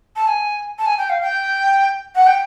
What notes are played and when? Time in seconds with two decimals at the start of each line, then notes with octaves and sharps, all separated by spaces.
0.16 A5
0.27 G#5
0.78 A5
0.86 G#5
0.98 G5
1.09 F5
1.21 G5
2.15 F#5
2.27 G5